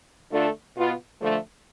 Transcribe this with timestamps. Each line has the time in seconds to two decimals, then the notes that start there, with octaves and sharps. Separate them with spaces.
0.32 D3 A3 D4 F4 A4
0.76 B2 B3 F4
1.21 D3 F3 A3